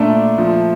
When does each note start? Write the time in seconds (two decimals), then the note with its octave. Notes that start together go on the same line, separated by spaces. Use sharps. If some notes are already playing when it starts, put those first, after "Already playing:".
Already playing: A#2 A3 D4
0.38 F3